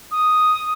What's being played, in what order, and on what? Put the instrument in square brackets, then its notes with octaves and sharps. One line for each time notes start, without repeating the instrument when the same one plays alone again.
[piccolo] D#6